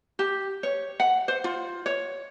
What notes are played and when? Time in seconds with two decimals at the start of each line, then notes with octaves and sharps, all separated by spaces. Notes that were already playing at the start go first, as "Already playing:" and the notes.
0.19 G4
0.63 C#5
1.00 F#5
1.28 C5
1.44 F4
1.86 C#5